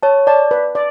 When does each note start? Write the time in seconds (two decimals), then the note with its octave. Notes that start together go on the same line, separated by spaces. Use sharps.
0.03 C#5 A5
0.27 D5 A5
0.51 B4
0.75 D5